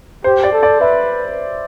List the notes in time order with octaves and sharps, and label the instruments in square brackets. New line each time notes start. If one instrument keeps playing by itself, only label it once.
[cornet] G4 [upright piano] C5
[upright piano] D5
[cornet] A4
[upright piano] D5
[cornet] B4 [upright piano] E5